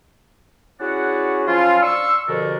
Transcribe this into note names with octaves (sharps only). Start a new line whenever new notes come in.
C#4 E4 F#4 G#4 D5 F#5
F3 F#3 C#4 E4 F4
D4 F5 C6 C#6 E6
G2 B2 D3 F3 D4 A#4